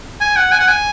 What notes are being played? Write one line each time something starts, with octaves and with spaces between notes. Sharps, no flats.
G#5
F#5
G#5
F#5
G#5